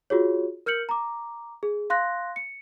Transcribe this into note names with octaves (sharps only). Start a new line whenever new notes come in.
F4 F#4 G#4 C#5
A#4 F6 G6 C#7 F#7
A#5 D6
G#4
F5 C6 F#6 A#6
C#7